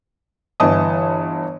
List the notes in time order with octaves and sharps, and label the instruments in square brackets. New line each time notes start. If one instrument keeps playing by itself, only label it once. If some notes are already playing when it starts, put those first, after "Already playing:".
[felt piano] G1 E3 D#5 A5 D#6